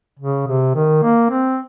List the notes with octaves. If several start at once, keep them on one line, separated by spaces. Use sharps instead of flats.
C#3
C3
D#3
A#3
C4